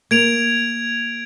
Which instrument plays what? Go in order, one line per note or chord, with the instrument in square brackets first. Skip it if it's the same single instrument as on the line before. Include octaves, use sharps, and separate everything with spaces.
[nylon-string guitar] A#3 [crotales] G#6 D7 F7